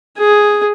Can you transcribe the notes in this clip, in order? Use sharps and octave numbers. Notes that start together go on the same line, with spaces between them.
G#4